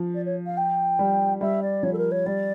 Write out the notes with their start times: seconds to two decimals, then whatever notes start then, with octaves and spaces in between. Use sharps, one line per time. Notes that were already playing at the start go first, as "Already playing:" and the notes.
Already playing: F3
0.14 D5
0.25 C#5
0.46 F5
0.57 G5
0.99 G3
1.41 G3 E5
1.62 D5
1.83 F3 C#5
1.93 A4
1.98 A#4
2.11 C#5
2.26 G3 D5